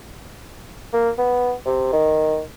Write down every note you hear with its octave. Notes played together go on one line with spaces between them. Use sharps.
A#3
B3
C3
D#3